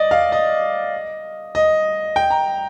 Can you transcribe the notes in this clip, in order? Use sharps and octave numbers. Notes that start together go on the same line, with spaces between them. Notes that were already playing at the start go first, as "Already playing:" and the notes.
Already playing: D5 D#5
F5
D#5
D#5
G5
A#5